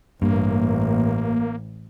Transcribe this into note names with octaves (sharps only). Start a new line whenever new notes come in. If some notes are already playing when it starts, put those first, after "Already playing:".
A1 G2 A#3